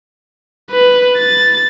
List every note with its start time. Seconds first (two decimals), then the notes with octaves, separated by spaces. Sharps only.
0.71 B4
1.18 A6